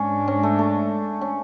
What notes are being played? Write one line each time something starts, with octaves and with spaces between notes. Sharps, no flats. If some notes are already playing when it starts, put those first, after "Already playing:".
Already playing: G#2 G#3 C#4 D4
C#4
A3
A3
C#4